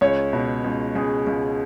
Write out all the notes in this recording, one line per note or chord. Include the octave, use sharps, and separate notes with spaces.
C#2 C#5
B2
C#2
C#2 G#4
C#2